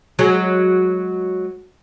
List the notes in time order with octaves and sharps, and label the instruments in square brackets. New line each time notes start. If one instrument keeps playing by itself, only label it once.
[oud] F#3 G#3